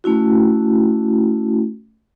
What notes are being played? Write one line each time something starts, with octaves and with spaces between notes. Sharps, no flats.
A3 C#4 E4 F#4